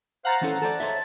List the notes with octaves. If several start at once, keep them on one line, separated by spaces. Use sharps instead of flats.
C5 F5 F#5 A#5 F6 A6
E3 C#4 A4 C5
A4 C5 D5 A5
C5 C#5 E5